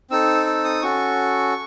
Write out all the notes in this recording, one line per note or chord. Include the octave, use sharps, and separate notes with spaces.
C4 D#4 A4 E6
E6
D#6
C#4 F#4 A4 C#6